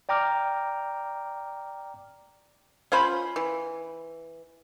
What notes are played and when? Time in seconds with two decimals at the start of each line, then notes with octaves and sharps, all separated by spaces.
0.09 D5 G5 A#5 D6 F6
2.92 C#4 F4 C5 B5
3.36 E3